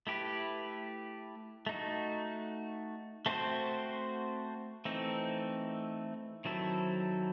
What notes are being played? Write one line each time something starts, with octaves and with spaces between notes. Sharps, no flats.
A3 E4 G4 B4
A3 D#4 F#4
A3 C4 F#4 C5
E3 A3 C4 D#4
D#3 F#3 C4 E4 A4